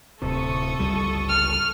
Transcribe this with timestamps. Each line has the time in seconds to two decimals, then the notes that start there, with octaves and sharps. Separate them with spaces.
0.22 D1 C3 A4 C#6 D#6
0.80 G1 C#2 G3
1.28 F6